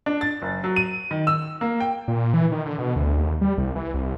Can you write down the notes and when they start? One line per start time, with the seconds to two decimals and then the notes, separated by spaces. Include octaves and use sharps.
0.06 D4
0.21 A6
0.42 F#1
0.64 F#3
0.76 D#7
1.11 D#3
1.27 E6
1.61 A#3
1.80 G5
2.08 A#2
2.34 E3
2.52 D#3
2.66 D3
2.79 B2
2.96 D2
3.17 D#2
3.41 G3
3.58 C2
3.76 E3
3.94 C2